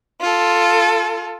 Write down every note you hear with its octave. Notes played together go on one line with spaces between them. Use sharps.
F4 A4